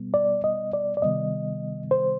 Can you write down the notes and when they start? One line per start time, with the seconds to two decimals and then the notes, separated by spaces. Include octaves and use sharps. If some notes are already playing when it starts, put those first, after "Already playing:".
Already playing: B2 G3 B3
0.14 D5
0.44 D#5
0.73 D5
0.97 D5
1.02 C3 D#3 G3 B3 D#5
1.91 C5